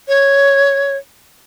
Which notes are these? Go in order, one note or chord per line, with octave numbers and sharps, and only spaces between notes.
C#5